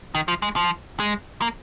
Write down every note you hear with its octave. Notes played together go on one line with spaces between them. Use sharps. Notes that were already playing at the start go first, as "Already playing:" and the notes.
D#3
F3
G#3
F3
G#3
A#3